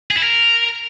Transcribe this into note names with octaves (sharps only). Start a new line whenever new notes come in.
G#4
E4
A#4